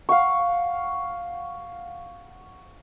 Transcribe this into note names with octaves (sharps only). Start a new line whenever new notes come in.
F5 F#5 C#6